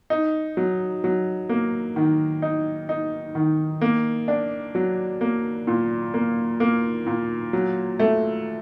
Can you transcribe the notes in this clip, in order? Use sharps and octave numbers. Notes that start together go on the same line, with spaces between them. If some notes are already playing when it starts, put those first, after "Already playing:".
D#4
F#3
F#3
A#3
D#3
D#4
D#4
D#3
A#3
D4
F#3
A#3
A#2
A#3
A#3
A#2
F#3
A3